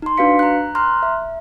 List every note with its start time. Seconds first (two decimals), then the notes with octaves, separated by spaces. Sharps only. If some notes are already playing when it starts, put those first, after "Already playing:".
0.02 D#4 C6
0.17 D4 F#4 B4 F5 B6 C#7
0.39 A#5 F#6
0.75 A#5 C6 F6 F#6
1.03 E5